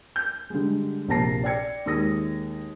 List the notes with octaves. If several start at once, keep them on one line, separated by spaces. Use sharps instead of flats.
G6
D3 G3 G#3
A#1 C3 A#3 A5 A#6 C7
D5 G5 G#6 C#7
D#2 G#3 D#6 A#6